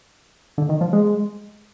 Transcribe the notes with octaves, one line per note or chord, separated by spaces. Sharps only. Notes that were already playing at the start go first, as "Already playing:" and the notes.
D3
D#3
F3
G#3